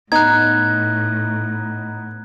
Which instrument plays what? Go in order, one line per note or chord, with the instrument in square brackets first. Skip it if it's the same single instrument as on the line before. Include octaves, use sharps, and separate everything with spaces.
[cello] A2 [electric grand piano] B3 D#4 D#5 [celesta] A#5 [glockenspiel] F#6 G#6